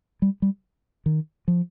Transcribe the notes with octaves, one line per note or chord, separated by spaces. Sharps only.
G3
G3
D#3
F3